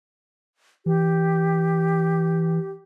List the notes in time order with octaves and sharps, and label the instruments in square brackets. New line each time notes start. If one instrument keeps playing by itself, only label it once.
[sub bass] E3 [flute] G4